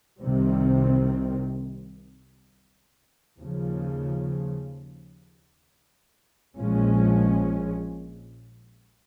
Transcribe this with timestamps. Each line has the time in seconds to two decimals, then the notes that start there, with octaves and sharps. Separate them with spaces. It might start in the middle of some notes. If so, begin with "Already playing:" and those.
0.22 C2 C3 D#3 G3 C4
3.40 D#2 C#3 F3
6.58 A#1 A#2 F3 G#3 C#4